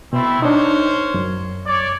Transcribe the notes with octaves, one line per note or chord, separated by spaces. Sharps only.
B2 A3 C4 E4
D4 D#4 A#4 C5 C#5
F#2
C#5 D5